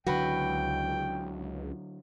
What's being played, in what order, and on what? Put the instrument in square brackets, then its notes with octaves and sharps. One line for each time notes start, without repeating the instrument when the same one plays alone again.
[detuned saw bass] C#2 [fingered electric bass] D3 F#3 [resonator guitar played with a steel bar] F#4 B4 [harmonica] G5